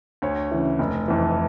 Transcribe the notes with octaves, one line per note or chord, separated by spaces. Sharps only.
D2 C#5
C#3 E3
F1
F2 E3